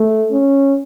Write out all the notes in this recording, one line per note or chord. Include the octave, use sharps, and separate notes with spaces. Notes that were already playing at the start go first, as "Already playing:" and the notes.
Already playing: A3
C#4